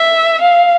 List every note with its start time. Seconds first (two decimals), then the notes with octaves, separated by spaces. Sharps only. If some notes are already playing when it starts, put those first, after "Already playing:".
Already playing: E5
0.42 F5